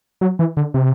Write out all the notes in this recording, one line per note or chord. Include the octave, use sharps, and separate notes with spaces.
F#3
E3
D3
C3